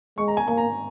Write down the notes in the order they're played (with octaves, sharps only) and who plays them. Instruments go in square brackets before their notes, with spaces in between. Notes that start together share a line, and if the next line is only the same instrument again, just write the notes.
[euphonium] G#3 [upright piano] C#6
[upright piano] A#5
G#5
[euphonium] A#3 [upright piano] G#5
[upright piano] A#5